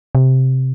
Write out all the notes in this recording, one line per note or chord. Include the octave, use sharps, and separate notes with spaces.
C3